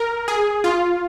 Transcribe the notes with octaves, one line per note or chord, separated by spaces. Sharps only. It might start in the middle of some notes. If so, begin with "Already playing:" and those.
Already playing: A#4
G#4
F4